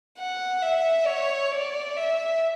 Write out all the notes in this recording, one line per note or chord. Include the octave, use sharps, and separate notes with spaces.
F#5
E5
C#5
D5
E5